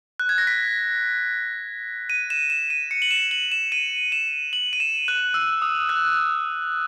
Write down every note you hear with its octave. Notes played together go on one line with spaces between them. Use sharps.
F#6
G#6
A#6
B6
D#7
E7
E7
D#7
C#7
F#7
E7
F#7
E7
D#7
E7
F#7
D#7
E7
F#6
E6
D#6
F#6